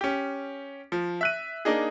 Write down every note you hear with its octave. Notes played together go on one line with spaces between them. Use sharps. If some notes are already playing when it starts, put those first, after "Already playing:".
C#4 G4
F3
E5 F#6 D#7
A#3 D4 D#4 G#4